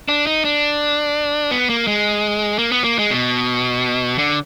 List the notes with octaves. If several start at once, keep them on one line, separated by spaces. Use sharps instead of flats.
D4
D#4
D4
B3
A#3
G#3
A#3
B3
A#3
G#3
B2
D3